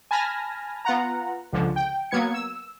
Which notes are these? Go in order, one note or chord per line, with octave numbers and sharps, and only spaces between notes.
G#5 A5 B5 F6 A#6
B3 F4 F#5 A#5
C#2 D3 F3
G5
F#3 A#3 B3 G#6 C#7
E6